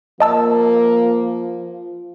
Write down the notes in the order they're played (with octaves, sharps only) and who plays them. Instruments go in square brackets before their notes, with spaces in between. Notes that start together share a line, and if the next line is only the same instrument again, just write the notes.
[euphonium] F3 [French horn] A#3 [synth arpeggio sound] D#5 A5 E6